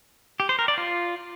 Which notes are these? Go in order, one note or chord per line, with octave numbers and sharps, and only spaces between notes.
G4
C5
A#4
D5
F4